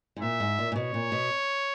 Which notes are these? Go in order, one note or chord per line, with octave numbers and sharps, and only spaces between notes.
G#2
A#2 E5
G#2
A#2
A#2
B2 C#5
A#2
B2